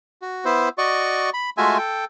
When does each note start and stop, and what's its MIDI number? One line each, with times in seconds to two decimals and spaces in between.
0.22 0.45 66
0.45 0.69 59
0.45 0.69 64
0.45 0.69 72
0.78 1.30 66
0.78 1.30 74
0.78 1.30 75
0.78 1.30 85
1.34 1.50 83
1.58 1.78 56
1.58 1.78 57
1.58 1.78 65
1.58 1.78 66
1.58 1.78 76
1.58 1.78 80
1.78 2.05 69
1.78 2.05 79